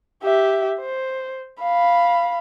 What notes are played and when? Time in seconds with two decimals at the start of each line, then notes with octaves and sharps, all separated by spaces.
0.23 G4 E5
0.80 C5
1.61 F5 B5